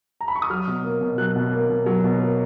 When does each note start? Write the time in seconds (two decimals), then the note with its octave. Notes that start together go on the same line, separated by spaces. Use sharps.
0.21 A#5
0.28 B5
0.35 C#6
0.42 D#6
0.50 F#3 F6
0.67 B2
0.84 A#3
1.01 B2
1.18 F#3 F#6
1.36 B2
1.52 A#3
1.70 B2
1.86 F#3
2.04 B2
2.20 A#3